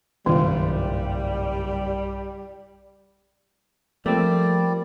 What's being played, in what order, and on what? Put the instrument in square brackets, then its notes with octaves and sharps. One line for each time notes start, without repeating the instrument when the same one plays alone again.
[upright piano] F#1 F4 [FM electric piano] B1 G2 [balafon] D#3 [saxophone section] G3
[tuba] F3 [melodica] G3 D5 [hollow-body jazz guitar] A3 C4 [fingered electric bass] A#3